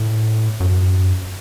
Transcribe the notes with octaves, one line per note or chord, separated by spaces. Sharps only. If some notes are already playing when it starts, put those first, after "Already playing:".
Already playing: A2
F#2